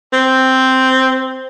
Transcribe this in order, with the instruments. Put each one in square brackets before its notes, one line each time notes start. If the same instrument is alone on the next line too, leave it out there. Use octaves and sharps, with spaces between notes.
[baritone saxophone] C4